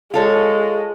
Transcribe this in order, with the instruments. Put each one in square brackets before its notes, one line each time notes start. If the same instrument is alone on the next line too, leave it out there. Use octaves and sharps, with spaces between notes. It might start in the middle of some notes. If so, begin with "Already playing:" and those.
[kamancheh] G#3 [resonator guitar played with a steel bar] F4 A4 C#5